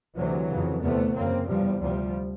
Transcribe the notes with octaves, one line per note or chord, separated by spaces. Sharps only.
D2 C3 E3 F#3
F2 C#3
E2 C3 A3 B3
F#2 C#3 A#3 C4
E2 C3 F3 G3
D2 C3 F3 G3